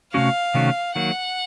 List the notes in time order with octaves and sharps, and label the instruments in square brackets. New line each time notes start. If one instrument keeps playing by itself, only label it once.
[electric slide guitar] C3 D#3 A3 C#4 F#4 [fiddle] F5
[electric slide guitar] C3 D#3 A3 C#4 F#4
[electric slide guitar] D#3 F#3 A#3 [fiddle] F#5